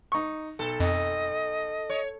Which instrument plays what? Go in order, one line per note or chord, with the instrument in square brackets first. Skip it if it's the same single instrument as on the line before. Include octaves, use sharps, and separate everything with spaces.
[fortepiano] D#4 C#6
[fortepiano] B1 [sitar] A4
[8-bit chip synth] F2 [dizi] D#5
[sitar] C#5